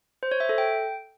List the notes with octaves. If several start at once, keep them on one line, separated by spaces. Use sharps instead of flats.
C5
C#5
E5
A4
G5